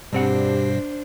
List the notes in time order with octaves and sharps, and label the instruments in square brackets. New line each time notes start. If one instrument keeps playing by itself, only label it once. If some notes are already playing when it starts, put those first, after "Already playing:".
[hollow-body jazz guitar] G2 C4 F#5 [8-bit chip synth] B2 [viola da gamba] D4 C5 [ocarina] G4